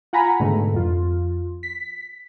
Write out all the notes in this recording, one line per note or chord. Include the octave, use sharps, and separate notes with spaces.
F4 F#5 G#5 A#5 B5
G#2 B2 D3 A3
F2 F4
B6